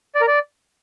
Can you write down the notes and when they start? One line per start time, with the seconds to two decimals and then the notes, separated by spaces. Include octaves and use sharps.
0.15 D5
0.21 A#4
0.28 D5